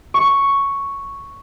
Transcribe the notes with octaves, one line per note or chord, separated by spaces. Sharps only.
C#6